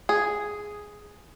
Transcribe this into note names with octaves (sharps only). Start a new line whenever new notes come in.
G#4